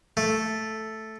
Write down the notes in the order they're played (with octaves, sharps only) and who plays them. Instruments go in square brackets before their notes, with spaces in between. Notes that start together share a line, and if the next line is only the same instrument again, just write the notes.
[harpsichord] A3